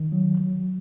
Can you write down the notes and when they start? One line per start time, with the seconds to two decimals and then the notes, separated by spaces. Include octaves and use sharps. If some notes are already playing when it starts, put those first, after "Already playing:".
Already playing: D#3
0.12 F#3
0.40 F#3